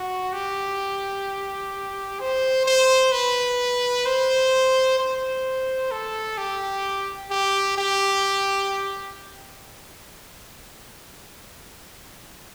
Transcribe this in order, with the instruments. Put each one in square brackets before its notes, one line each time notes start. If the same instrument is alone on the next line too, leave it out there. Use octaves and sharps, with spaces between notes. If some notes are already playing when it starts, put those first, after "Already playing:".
Already playing: [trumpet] F#4
G4
C5
C5
B4
C5
C5
A4
G4
G4
G4